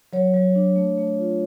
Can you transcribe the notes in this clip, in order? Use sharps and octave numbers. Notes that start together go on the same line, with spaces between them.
F#3 C#5
F#3
D4
A3
A3
F4